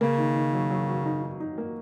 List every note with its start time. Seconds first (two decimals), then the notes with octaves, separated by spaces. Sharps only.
0.01 C#3 A#3
0.18 D#3
0.36 D#3
0.53 F#3
0.70 F#3
0.88 F#3
1.06 D#4
1.23 D#4
1.40 D#4
1.58 A#3